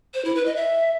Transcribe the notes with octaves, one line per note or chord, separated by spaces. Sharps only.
C5
E4
B4
D#5
E5